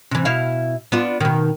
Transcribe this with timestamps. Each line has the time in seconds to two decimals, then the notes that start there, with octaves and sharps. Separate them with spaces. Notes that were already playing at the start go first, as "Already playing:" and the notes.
0.11 C3 E3
0.25 B2 E4 F5
0.92 B3 D4 F4
1.21 B2 D#3